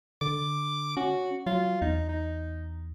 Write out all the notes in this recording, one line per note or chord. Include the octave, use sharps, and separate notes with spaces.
D3 D6
C#4 F#4
F#3 F4
E2 D#4
D#4